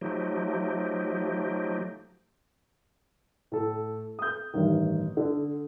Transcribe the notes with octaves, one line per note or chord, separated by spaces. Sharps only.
F3 F#3 A3 D#4 G4
A2 A4
D#6 G6
A1 G2 D#3
D3